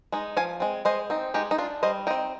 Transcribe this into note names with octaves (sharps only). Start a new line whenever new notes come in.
G#3 D#4
F3 F5 G#5
G#3 C4
G#3 C5 D#5
C4 D#4
G#3 D#4 G4
D#4
D4 F4
G3 C5 D#5
C4 D#4 D#5 G5